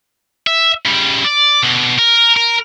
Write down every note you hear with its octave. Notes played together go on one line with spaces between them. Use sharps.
E5
C#3 G3
D5
B2 D3
A#4
A#4